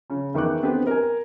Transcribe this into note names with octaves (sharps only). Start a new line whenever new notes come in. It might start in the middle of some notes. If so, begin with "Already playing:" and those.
C#3 C#4
E2 D#3 C#6 D6 F#6
B3 C4 D4 G4 A4 B4
A#4 G#5